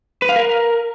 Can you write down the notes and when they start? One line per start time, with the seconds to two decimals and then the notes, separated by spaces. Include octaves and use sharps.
0.22 B4
0.29 F5
0.36 A#4